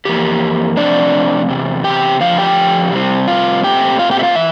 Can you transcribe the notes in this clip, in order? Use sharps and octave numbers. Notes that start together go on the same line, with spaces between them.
F2 E3 A#3 G4
C3 F3 A3 C4 D4 D5
E2 C3
G4 G5
F2 D3 F3 F5
G4 G5
C3 G3 C4
F4 F5
A#2 A3 C4 G4 G5
F4 F5
G4 G5
E5
F4 F5
E3 E5